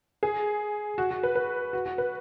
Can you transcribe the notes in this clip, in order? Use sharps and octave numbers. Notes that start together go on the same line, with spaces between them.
G#4
F#4
F#4
B4
B4
F#4
F#4
B4